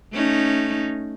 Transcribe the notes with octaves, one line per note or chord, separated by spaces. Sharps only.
A3 C#4 D#4